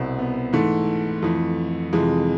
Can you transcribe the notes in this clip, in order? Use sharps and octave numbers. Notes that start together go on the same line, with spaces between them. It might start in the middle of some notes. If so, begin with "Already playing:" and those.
Already playing: C2 B2 C4
B3
G#2 E3 A3
F2 E3
F2 C3 E3 G#3